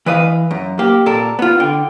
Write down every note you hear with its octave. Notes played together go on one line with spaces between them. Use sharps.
E3 B4 D#5 F5
F#2
A#3 G4
A#2 A4 A#4
B3 F4
D3 G5